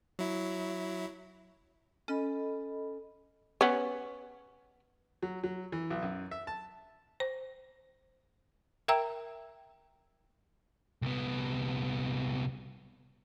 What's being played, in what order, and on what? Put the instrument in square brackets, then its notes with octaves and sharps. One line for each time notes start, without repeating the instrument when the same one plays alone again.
[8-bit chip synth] F#3 E4
[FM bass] C#4 [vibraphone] A4 D#5 B5
[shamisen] B3 C#4
[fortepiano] F#3
F#3
E3
B1
F#2
E5
A5
[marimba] C5
A#4 E5 G5 A#5 E6
[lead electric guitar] C2 B3